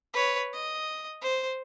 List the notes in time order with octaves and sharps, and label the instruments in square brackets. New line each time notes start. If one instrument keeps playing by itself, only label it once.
[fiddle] B4 C#5
D#5
C5